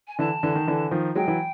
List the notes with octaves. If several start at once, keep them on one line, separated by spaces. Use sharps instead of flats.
G#5
D3 E3 A5
D3 E3
D#3
D3 E3
D#3 F3
F#3 G#3 G5
E3 F#3